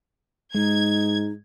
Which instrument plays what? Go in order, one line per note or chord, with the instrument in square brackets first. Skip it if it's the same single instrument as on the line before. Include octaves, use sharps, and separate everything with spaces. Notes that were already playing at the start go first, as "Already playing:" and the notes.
[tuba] G#2 [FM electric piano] G#3 [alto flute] D#4 [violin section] G#6